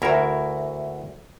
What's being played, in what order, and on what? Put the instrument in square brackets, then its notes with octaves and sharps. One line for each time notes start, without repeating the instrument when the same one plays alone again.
[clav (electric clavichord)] D2 A#4 [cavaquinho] E4 F#4